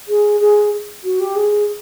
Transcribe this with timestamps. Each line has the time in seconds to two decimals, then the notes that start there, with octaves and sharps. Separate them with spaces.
0.08 G#4
0.40 G#4
1.04 F#4
1.20 G4
1.36 G#4